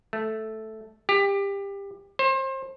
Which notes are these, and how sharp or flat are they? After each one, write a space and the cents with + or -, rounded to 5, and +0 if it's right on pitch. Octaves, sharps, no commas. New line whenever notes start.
A3 -5
G4 +25
C5 +30